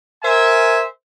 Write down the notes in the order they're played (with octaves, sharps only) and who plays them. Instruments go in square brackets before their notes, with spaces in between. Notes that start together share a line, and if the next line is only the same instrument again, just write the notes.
[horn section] A#4 C5 E5 G#5